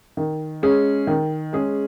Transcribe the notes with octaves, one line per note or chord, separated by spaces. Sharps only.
D#3
G#3 C#4 G#4
D#3
G#3 C#4 G#4